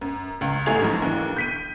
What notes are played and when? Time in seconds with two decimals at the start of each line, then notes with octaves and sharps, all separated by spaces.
0.01 F#2
0.41 C#2 C#3
0.66 A1 A3 G#4 G#6 F7
0.82 G#2 F3 F#3
1.02 D#2 D3 E3 D4
1.36 G6 B6 D#7